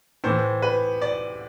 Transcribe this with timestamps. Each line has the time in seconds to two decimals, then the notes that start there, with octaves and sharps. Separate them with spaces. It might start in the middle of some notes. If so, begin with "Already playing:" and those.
0.24 A2 E3 C5
0.62 B4
1.02 D5